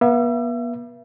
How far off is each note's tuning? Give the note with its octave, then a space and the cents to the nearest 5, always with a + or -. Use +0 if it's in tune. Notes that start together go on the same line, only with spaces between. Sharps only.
B3 -40 E5 +35